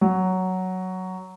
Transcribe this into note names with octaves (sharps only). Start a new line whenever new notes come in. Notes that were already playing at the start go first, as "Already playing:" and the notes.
F#3